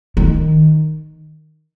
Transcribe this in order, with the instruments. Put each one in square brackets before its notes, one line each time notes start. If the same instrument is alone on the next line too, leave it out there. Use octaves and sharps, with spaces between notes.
[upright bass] D#3